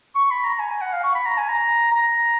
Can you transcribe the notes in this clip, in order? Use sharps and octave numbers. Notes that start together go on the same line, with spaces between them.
C#6
B5
A#5
G#5
G#5
F#5
F5
C#6
B5
A#5
G#5
A#5
A#5